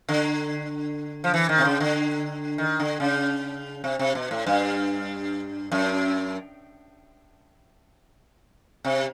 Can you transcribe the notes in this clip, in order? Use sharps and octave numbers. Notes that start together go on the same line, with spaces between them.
D3
F3
E3
D#3
C3
C#3
D3
D#3
D3
C#3
C3
C3
B2
A2
G2
F#2
C3